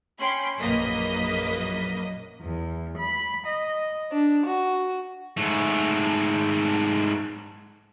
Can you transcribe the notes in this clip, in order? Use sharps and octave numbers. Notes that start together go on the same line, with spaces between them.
C#4 G5 B5 C6
A#1 F#2 A#3 B4 D#5 B6
E2
B5
D#5
D4
F#4
G#2 A3